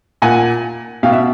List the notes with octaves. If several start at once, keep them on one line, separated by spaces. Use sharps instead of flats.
A#2 F#5 G#5
B2 F5 G5
E5 F#5